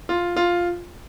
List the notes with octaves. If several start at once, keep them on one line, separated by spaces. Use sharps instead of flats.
F4
F4